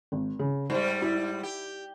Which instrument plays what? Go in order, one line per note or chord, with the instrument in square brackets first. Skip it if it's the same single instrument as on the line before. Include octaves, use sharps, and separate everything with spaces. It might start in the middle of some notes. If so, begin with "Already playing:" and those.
[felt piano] G#1
C#3
[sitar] G#2 G3 [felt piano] C5
[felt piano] E4
[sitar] G4